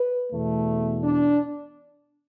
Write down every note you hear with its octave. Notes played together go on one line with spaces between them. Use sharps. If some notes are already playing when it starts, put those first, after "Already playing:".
Already playing: B4
E2 B2 A3
D4